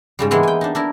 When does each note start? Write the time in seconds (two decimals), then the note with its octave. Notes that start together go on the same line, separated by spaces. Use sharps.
0.19 G#2 C#3 G3
0.31 E3 G#3 A#3 B3 E4
0.43 G5 G#5
0.61 D4 D#4
0.75 D4 E4 A#4